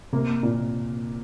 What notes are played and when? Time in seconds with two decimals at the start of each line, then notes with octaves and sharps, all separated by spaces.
0.13 C3 A#3
0.43 A#2